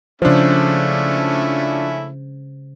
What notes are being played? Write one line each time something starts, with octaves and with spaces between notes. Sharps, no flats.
C#3 F3 A3 C#4 D4 E4 C5